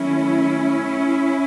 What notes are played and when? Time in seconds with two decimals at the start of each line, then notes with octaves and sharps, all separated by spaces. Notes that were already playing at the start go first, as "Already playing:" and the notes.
Already playing: D#3 F#3 A3 C#4 E4